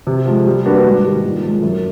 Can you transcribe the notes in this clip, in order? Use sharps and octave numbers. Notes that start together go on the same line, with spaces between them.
C3
F3 G#3
G3
A#3 D4 F#4 B4
G#2
D#3 G3
A#2
F3 G#3
F#2